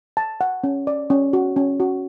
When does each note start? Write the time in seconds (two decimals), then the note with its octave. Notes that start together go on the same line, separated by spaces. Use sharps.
0.17 A5
0.41 F#5
0.64 C#4
0.87 D5
1.10 C#4
1.33 F#4
1.56 C#4
1.80 F#4